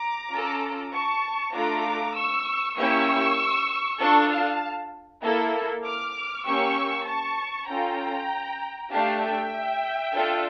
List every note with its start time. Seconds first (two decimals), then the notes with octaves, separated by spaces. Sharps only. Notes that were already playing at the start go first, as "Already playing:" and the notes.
Already playing: A#5 D6
0.32 C#4 F4 A4
0.93 A5 C#6
1.54 A3 D4 F4 A4 A#5 D6
2.15 C#6 E6
2.77 A#3 C#4 E4 G4 C#6 E6
4.00 D4 F4 A4 A5 C#6
4.31 F5 A5
5.23 A#3 E4 A4
5.84 D6 F6
6.46 A#3 C#4 G4 C#6 E6
7.07 A5 C#6
7.68 C#4 F4 A4 G5 A#5
8.91 A3 D4 G4 F5 A5
9.22 E5 G5
10.14 D4 F4 A4